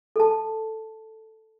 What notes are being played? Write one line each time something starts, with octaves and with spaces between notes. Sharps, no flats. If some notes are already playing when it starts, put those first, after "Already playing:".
A4 A5